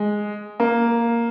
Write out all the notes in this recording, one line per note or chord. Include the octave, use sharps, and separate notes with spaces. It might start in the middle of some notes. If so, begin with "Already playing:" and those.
Already playing: G#3
A#3